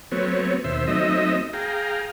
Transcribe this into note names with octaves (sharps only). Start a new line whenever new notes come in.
F#3 A3 B3 C4 C#5
D#2 B2 C5 E5
F#3 A3 C4 D#4 D#5 E5
G#4 F5 G5 A#5